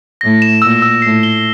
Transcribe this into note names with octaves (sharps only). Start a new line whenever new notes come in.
A2 A#6
E7
A#2 E6
E6
A2 C7
G7